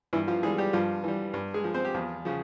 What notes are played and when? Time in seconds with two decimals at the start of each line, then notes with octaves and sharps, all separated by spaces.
0.13 G2 E3 E4
0.28 F3 F4
0.43 E3 G3 G#3 G#4
0.58 G3 G4
0.73 G2 F3 F4
1.04 E3 G3
1.34 G2
1.54 G#3 G#4
1.64 F3
1.74 C4 C5
1.85 G4
1.94 E2 F3 F4
2.25 C#3 F3